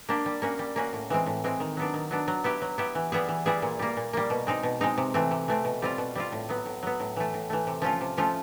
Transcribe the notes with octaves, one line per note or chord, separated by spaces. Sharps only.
A#3 D4 G4
G3
A#3 C#4 F#4
G3
A#3 C#4 F#4
A2
E3 G#3 C4
A2
E3 G#3 C4
D#3
F#3 B3 D4
D#3
F#3 B3 D4
F#3
B3 E4 G4
F#3
B3 E4 G4
E3
G3 B3 E4 G#4
E3
G3 B3 E4 G#4
A#2
G3 A#3
A#2
G3 A#3
B2
G#3 C4 D#4
B2
G#3 C4 D#4
C3
E3 A3 C4
C3
E3 A3 C4
B2
G3 C4 F4
B2
G3 C4 F4
A2
F#3 B3
A2
F#3 B3
A2
E3 A3
A2
E3 A3
C3
F3 A3 C#4 F4
C3
F3 A3 C#4 F4